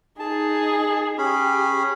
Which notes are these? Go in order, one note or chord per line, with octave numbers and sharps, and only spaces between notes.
D#4 G#4 A5
C#4 G4 G#4 B5